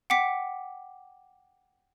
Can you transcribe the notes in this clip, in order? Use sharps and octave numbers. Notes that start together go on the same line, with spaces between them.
F#5 G5 D6 B6